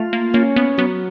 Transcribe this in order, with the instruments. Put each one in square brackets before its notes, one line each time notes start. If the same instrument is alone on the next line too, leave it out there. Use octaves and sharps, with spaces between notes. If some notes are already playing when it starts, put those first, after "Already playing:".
Already playing: [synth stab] A3 [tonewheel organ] F4
[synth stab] A#3
[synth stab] A#3 [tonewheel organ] C#4
[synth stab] B3
[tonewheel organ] F#3 [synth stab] B3